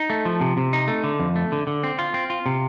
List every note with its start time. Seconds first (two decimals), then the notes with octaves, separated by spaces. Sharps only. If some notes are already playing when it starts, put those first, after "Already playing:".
Already playing: D#4
0.10 A3
0.25 F3
0.41 C3
0.57 C3
0.73 D#4
0.88 A3
1.04 D3
1.20 F2
1.36 A3
1.52 D3
1.67 D3
1.83 C4
1.99 F4
2.14 C4
2.30 F4
2.46 C3